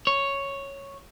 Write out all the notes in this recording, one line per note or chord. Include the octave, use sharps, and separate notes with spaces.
C#5